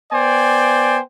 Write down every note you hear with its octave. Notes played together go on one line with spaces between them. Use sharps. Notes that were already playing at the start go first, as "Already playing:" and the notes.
B3 C5 D5 G5 G#5